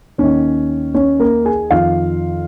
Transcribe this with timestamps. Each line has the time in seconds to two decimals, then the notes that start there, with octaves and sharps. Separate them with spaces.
0.18 D#2 D#3 C#4 C#5
0.94 C#4 C#5
1.20 A#3 A#4
1.45 G#4 G#5
1.71 F2 D#3 F4 F5